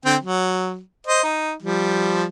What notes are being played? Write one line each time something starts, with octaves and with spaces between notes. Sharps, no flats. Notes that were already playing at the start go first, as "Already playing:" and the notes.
D3 C4 G5
F#3
C5 D#5
D#4
F3 G3